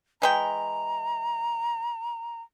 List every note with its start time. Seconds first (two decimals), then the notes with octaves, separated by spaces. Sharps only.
0.22 E3 G#3 G5 A#5